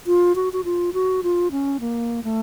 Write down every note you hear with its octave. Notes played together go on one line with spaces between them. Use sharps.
F4
F#4
F#4
F4
F#4
F4
C#4
A#3
A3